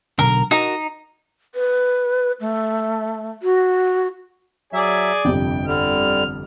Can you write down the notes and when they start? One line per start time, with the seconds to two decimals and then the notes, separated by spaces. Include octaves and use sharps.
0.19 B1 F#2 D3 A#4
0.51 D#4 F#4 A#4
1.55 B4
2.40 A3
3.43 F#4
4.73 F#3 G#4 D5 E5 G#5
5.25 G1 F2 C3 G5
5.68 D3 G3 F6